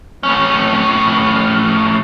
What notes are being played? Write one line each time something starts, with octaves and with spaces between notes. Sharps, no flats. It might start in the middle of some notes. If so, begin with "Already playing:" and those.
A2 C#4